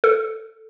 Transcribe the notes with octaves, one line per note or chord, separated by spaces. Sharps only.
A4